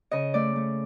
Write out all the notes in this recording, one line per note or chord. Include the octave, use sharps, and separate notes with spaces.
C#3 D#5
A3 D5
A3